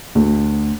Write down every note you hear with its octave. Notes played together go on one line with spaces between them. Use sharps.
D2